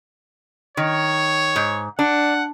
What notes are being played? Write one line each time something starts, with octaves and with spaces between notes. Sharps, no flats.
D#3 C#5
G#2
D4 F#5